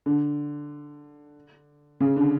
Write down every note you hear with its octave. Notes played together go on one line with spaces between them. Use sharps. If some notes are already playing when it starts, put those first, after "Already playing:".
D3
C#3
D3